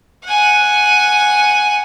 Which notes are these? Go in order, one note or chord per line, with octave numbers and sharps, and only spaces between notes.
F#5 G#5